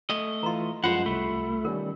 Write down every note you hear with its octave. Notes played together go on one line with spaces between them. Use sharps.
A3 D#5
E3 F4 A#5 C6
F#2 F3 G#3 F4 C5 F#5
C2 A3 B5
D#3 G3 C#4 A#4